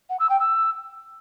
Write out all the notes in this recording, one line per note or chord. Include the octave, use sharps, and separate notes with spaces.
F#5
E6
G5
E6